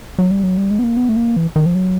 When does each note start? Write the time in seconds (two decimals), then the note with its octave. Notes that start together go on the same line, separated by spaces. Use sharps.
0.19 F#3
0.31 G3
0.43 F#3
0.57 G3
0.71 G#3
0.79 B3
0.84 A#3
0.97 B3
1.09 A3
1.16 A#3
1.36 E3
1.56 D#3
1.66 F3
1.75 F#3